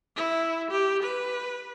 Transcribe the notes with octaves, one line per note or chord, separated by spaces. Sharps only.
E4
G4
B4